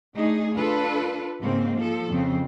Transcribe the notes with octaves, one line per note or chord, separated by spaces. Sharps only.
A3 D4 D#4 G#4
D4 F4 A4 B4
G#2 C#3 A#3 C4
F3 A4
F2 C#3 C4